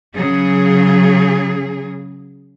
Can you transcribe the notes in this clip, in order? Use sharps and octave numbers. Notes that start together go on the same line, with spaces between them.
C#3 F#3 G#4